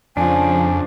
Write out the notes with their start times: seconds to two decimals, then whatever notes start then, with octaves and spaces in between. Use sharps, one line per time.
0.17 F2 C#3 F3 D4 G#5